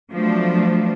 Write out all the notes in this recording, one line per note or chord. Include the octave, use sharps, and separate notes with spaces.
F3 F#3 A3 B3 D4